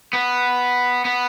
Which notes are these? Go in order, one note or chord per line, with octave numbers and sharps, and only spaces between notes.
B3
B3